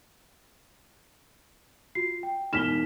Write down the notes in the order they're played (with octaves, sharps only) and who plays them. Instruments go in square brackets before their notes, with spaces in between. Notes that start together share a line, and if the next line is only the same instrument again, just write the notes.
[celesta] F4 F#4 C7
G5
[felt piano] E1 F6 E7 [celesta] D#4 B6 G7